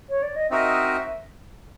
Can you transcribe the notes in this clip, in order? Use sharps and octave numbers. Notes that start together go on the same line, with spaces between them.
C#5
D5
D#5
C4 D#4 F#4 A#4 D#5 E5